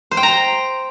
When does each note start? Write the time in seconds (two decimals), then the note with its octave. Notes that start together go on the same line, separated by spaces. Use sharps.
0.11 C5
0.17 G5
0.23 A#5